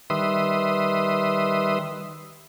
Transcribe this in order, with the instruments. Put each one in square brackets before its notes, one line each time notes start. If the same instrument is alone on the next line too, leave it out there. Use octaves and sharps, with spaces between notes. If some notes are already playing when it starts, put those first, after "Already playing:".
[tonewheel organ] D#3 G3 B4 E5 C6 D#6